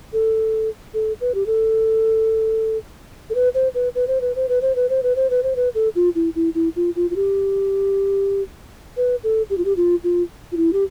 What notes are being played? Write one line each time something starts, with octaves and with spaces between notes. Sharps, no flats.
A4
A4
B4
G4
A4
A4
B4
C5
B4
B4
C5
B4
C5
B4
C5
B4
C5
B4
C5
B4
C5
B4
A4
F4
E4
E4
E4
F4
F4
F4
G4
B4
A4
G4
F4
G4
F4
F4
F4
E4
G4